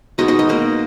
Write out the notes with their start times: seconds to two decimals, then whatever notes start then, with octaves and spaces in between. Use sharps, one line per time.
0.18 B2 G#3 B3 D#4 F#4
0.28 D#4 F#4
0.39 D#4
0.49 B2 A#3 D#4